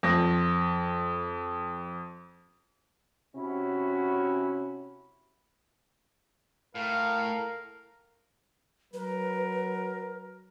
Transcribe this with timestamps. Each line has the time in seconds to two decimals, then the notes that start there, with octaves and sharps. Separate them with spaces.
0.03 F2 A#6
3.36 C3 C#4 E4 F#4
6.75 A2 A#4 F5
8.94 F#3 A#4 B4